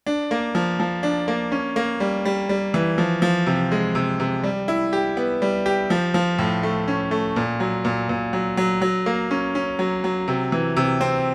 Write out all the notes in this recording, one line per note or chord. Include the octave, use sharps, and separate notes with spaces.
D4
A#3
F3
F3
D4
A#3
C#4
A#3
G3
G3
G3
E3
F3
F3
C3
G#3
C3
C3
G3
E4
G4
B3
G3
G4
F3
F3
A2
A3
C#4
A3
A#2
F#3
A#2
A#2
F#3
F#3
F#3
A#3
C#4
C#4
F#3
F#3
C3
E3
C3
C4